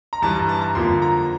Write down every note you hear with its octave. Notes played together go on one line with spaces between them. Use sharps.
A#5
G2 E3 G3 A5
A#5
A5
A#5
F2 D3 F3 A#3 C6
A#5